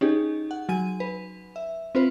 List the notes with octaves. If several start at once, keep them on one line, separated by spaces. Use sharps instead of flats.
C#4 D#4 G4 G#4
F#5
F#3 G#5 D#7
B4
E5
C4 F4 B4 C5